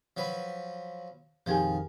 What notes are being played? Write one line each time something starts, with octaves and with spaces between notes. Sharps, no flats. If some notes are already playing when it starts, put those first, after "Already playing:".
F3 F#3 B4
A#1 F2 D#3 F3 G4 G#4 G#5